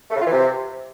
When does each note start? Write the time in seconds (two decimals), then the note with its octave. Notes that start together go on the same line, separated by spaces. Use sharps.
0.11 A3
0.16 C#3
0.21 F4
0.26 E3
0.32 C3